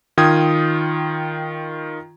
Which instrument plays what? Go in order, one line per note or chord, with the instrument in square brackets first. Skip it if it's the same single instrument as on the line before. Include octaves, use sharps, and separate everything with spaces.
[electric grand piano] D#3 F4 G5 D#6 G#6